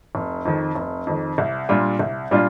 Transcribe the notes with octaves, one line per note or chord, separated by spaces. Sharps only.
F1
F2 D#3
F1
F2 D#3
C2
A#2 G3 D4 F4
C2
A#2 G3 D4 F4